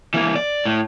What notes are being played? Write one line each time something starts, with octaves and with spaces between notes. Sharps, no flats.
E3 A#3
D5
A2